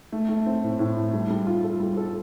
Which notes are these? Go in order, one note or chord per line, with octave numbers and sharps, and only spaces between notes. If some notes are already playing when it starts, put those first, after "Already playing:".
A3
A3
C4
A2
A2
A3
G3
G3
F4
A4
G3
A4